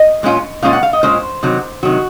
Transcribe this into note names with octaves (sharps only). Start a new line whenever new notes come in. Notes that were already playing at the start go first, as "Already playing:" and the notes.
Already playing: D#5
A#2 G#3 C#4 F4
A#2 G#3 C#4 F4 F5
F#5
F5
D#5
A#2 G#3 C#4 F4 C5
C3 D#3 F#3
C3 D#3 F#3 F#4